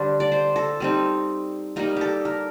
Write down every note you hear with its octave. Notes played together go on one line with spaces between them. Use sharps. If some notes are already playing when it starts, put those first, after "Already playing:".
Already playing: D3 G3 D4 C5
D5
C5
A4
G3 C4 D#4
G3 A#3 D#4 A#4
G4 A4
A#4